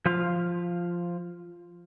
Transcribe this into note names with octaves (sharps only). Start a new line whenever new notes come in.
F3 F4 F5